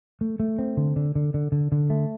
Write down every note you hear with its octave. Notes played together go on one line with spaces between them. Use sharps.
A3
A3
C4
D3
D3
D3
D3
D3
D3
A3